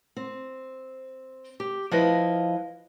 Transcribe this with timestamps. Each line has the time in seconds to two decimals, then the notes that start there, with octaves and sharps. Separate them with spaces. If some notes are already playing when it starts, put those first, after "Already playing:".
0.17 C4
1.60 G4
1.91 F3 E4 B4 D#5 F5